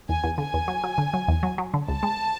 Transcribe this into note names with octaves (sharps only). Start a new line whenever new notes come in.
E2 G#5
E2
D3 G#5
E2
F#3
F#3
D3
F#3
E2
F#3
F#3
D3
C#2 A5
G#3